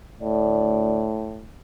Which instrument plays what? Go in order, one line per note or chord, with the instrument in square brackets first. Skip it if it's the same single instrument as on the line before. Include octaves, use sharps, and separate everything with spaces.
[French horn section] D2 D5 [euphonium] A2